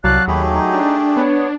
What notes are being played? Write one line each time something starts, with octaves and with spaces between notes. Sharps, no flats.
C2 F#3 D5 F5 A5 F#6
D#2 A3 G4 G#4 B5
D#4
D4
B3 C#5